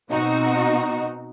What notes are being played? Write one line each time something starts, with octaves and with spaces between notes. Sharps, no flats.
B2 C4 D#4 F#4